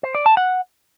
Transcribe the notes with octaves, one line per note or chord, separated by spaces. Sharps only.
C5
D5
A5
F#5